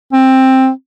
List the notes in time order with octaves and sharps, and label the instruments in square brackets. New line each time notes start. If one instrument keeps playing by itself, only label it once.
[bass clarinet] C4